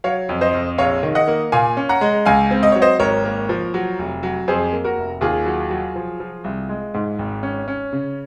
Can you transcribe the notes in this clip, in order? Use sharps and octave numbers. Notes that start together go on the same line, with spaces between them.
F#3 C#5 F5
F2
C5 D#5
F2
A#1 C#5 F5
D#3
D#5 F#5
A#3
A#2 F5 G#5
C#4
F#5 A#5
G#3
C#2 F5 G#5
C4
D#5
F#3 C#5
C5 D#5
G#1 A#4 C#5
A#3
F3
F#3
F1
F#3
F2 G#4 C5
A#3
F#4 A#4
F1
D#2 F4 G#4
F#3
F#3
F3
F3
C2
G#3
G#2
G#1
C#4
C#4
C#3